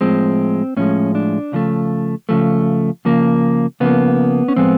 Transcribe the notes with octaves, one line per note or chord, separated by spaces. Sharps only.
A2 F3 G#3 C4
A2 F3 G#3 C#4
D4
C#3 F3 A3
C#3 F3 A3
C#3 F3 A#3
C#3 F3 A#3 B3
C#4
A2 F3 G#3 B3 C4